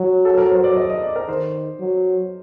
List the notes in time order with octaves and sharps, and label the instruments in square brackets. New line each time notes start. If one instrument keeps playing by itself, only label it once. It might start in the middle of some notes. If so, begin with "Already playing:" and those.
Already playing: [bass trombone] F#3
[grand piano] A4
A#4
C5
D5
D#5
D#5
D5
A#4
[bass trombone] D#3 [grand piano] C5
[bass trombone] F#3